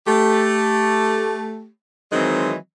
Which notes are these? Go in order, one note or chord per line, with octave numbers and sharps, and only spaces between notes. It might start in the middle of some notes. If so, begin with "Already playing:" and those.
A3 G4
D#3 E3 F#3 G#3 C4 D#5